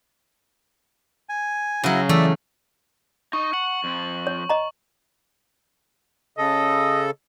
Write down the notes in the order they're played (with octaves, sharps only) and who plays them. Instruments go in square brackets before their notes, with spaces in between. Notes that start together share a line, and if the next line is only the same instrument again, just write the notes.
[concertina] G#5
[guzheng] C#3 F#3 [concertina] E4 F#4
[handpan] E3 [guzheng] A3 [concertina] D5 E5
[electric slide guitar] D#4 D#5 [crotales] C#6
[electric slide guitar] F#5 [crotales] F#7
[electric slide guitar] F2 F3
[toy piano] C#5
D#5 A#5
[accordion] C#3 A4 [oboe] D#5